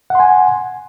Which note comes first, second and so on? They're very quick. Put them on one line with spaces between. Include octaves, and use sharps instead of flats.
F#5 C6 G#5